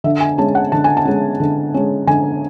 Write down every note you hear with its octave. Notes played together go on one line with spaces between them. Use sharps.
D3 E5
G#5
G#3 C#4 A5
F#5
D3 A5
G#5
A5
G#3 C#4
D3
G#3 C#4
D3 G#5